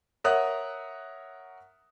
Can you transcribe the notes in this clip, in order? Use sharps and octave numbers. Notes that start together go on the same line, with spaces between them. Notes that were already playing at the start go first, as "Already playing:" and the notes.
A#4 C#5 E5 F#5 D#6 F#6